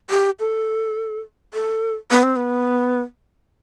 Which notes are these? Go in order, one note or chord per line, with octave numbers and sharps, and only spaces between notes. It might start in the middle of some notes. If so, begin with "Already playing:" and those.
G4
A4
A4
B3
C4
B3